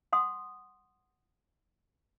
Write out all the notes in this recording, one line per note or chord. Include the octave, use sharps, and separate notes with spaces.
F#5 C6 D#6